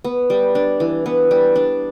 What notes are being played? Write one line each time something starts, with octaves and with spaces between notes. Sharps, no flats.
B3
G3
D4
E3
B3
G3
D4